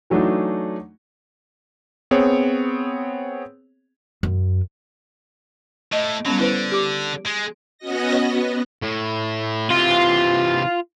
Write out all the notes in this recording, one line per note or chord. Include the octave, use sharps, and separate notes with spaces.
E3 F#3 A3 D4 D#4 F#4
B3 C4 G#4 C#5
F#2
A2 D#5
F#3 G3 B3 C#4
D3 E4 B4 C5
G4 D6
G#3
B3 C#4 F#4 D#5 A#6
B3
A2
C3 E3 F4